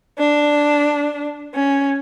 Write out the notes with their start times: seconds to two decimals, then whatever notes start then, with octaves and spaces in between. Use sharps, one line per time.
0.19 D4
1.56 C#4